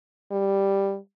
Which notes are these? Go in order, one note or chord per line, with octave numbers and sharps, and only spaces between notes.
G3